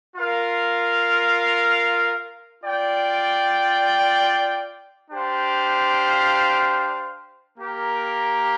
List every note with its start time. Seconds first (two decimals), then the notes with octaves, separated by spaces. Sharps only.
0.16 F4 A#4 F5
2.64 F4 D5 G5
5.11 D4 G4 C5 F5
7.57 A#3 G4 A#4